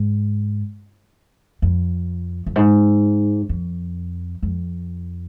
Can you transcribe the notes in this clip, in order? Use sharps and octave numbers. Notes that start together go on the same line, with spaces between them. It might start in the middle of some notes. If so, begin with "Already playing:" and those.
Already playing: G#2
F2
F2
G#2
F2
F2